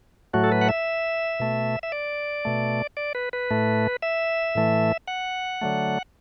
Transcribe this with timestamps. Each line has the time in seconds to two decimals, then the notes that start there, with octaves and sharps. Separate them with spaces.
0.34 A2 F#3 A3 F#4
0.44 A4
0.52 B4
0.61 F#5
0.69 E5
1.40 B2 A3
1.83 E5
1.92 D5
2.45 B2 A3
2.97 D5
3.15 B4
3.33 B4
3.51 A2 A3
4.02 E5
4.55 A2 E3 A3
5.08 F#5
5.61 D3 F#3 A3